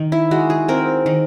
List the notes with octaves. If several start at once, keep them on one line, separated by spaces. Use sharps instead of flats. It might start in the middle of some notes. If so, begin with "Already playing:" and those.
Already playing: D#3
E4
G#3 F#4
G#4
C4 A#4
D#3